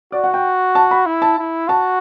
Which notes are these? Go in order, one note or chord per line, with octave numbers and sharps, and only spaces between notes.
F#4 D5
F#5
G5
A5
B5
E4
A5
E4
F#4 A5